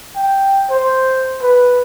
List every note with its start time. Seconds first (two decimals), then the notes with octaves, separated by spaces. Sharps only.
0.15 G5
0.70 C5
1.42 B4